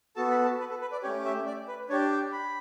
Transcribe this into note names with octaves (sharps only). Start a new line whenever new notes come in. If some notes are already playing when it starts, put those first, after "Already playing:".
B3 F#4 A4 A5
B5
A5
B4
A4
B4
D5
A3 C#4 G4 C#5
E5
D5
B4
D4 G4 C#5
G5
B5